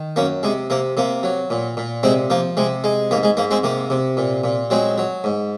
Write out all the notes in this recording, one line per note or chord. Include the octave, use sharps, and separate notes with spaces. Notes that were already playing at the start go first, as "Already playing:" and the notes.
Already playing: D#3
F#2 A#3 C#4
C3 G#3
C3 A#3
C3 A#3
F#3
A#2
A#2
C3 G#3 C4
F3 A#3
C3 G#3
G#3
G#2 A#3
G#3
G#2 A#3
G#3 C4
C3 A#3
C3
A#2
A#2
F#3 G#3 C4
F#3
G#2